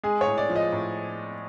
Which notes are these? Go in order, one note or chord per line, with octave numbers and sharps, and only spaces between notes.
G#3 G#4
C#5
A2
D5
F3
D#5
A2